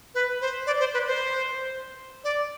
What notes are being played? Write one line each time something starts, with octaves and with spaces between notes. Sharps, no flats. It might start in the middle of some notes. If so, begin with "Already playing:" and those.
B4
C5
D5
C5
B4
C5
D5